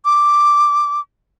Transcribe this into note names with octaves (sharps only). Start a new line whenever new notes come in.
D6